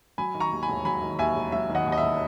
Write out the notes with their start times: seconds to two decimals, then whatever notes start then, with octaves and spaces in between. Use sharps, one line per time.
0.18 F#3 G#5 B5
0.35 D#3
0.40 A#5 C#6
0.52 D#2
0.63 G#5 B5
0.69 E1
0.85 F#3 G#5 B5
1.02 D#3
1.19 D#2 E5 G#5
1.36 E1
1.52 F#3 E5
1.69 D#3
1.75 D#5 F#5
1.86 D#2
1.92 D#5
1.98 E1 E5